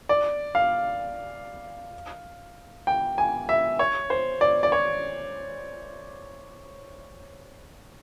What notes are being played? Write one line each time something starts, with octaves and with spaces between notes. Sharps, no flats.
D5
F5
G5
G#5
E5
C#5
C5
D5
D5
C#5